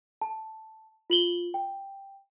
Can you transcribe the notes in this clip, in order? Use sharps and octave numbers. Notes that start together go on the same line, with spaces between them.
A5
F4 F#7 G7
G5